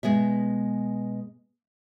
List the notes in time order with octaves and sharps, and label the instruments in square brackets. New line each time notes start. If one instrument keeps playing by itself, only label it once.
[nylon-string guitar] B2 G#3 B3 E5